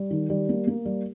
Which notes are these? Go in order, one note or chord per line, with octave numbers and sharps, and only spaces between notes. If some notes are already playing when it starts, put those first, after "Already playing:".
Already playing: G3
D#3
G3
A#3
A#3
G3